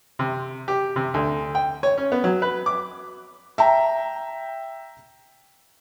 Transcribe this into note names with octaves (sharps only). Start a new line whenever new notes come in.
C3
G4
C3
D2
G5
C#5
C#4
B3
F#3
B4
D6
E5 G5 A#5